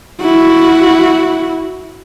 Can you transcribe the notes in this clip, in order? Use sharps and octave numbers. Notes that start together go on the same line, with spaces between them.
E4 F#4